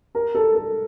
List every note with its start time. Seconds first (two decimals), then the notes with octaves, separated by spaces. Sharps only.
0.15 A#4
0.35 A4
0.55 A4